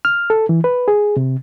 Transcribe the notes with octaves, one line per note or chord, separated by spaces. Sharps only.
F6
A4
E3
B4
G#4
C3